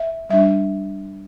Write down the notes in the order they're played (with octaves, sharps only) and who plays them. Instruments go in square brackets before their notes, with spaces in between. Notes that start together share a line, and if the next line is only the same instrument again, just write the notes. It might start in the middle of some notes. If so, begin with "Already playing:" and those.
Already playing: [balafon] E5
G3 D4 E5